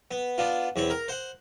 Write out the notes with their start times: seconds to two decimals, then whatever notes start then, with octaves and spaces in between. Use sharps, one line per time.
0.11 B3
0.38 B3 D4 F4
0.76 E2 C4 C#5 B5
0.90 A#4
1.08 C5 F#5